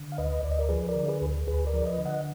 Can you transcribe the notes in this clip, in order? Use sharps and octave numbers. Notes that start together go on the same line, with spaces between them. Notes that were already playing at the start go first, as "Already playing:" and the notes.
Already playing: D3
F5
D2 B4 D#5
D2 D5
D#5
A#4 D5
F3 G#4 B4
A#4 D5
D3
G#4 B4
D2
D2 G#4 B4
A#4 D5
F3
B4 D#5
D3
D#5 F#5